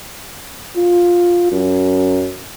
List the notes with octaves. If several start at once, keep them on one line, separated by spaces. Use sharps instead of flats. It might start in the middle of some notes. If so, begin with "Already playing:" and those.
F4
F#2